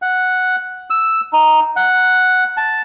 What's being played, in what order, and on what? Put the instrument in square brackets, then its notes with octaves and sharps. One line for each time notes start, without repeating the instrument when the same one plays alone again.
[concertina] F#5
E6
D#4
F#5
A5